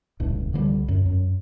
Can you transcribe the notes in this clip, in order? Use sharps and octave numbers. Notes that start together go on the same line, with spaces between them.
D#1 C#2 A2
C#2 D3 F3 G3
F#2
F#2